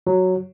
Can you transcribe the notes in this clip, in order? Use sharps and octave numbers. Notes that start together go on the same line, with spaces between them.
F#3